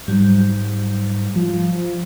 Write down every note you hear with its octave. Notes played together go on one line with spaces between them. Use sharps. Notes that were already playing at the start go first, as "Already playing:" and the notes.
G#2 F#3 G3
F3